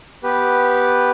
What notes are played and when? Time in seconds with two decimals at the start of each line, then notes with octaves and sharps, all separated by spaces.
0.23 B3 G4 B4